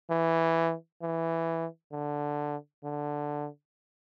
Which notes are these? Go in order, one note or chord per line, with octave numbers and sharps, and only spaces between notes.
E3
E3
D3
D3